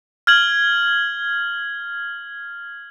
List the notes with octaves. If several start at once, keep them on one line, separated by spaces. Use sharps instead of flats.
F6 G#6 F#7